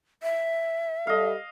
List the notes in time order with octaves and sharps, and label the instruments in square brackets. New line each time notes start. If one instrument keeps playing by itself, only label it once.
[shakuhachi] E5
[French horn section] G3 A4 [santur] D#5 F5